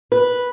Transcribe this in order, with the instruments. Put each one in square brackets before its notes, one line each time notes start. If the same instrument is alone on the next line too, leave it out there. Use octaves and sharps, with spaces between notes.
[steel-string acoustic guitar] B4